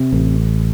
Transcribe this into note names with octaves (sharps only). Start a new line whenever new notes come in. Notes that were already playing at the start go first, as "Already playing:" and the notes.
Already playing: C3
A1